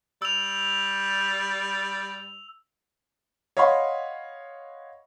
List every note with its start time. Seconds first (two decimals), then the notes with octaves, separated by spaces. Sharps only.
0.22 G3 E6 F7
3.57 C#5 D#5 F5 F#5 B5 C6